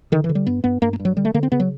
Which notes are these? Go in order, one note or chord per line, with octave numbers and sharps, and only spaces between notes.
D3 D#3
E3
D3
G3
G2 B3
G2 B3
G2 A#3
A#3
G2
F#3
D3 G3
A3
D3 A#3
C4
C#3 B3
F#3